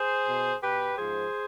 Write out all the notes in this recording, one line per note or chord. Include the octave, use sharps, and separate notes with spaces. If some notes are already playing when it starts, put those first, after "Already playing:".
Already playing: G#4 C5
B2
B2 G4 B4
G#2 F3 G#4 C5